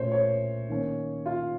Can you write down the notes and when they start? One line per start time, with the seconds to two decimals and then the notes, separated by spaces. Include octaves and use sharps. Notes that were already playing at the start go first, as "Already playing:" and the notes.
Already playing: A#2 A3 C#4 C5 C#5
0.12 C#5
0.69 D#3 A#3 C#4
1.26 F4 F5